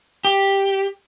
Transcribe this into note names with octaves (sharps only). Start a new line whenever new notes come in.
G4